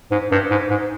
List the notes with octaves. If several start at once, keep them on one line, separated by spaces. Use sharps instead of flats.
G#2
G2
G#2
G#2